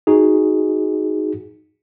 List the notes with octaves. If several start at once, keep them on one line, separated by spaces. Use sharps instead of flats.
D#4 F#4 G#4